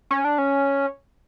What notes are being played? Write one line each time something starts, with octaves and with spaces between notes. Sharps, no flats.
C#4
D4
C#4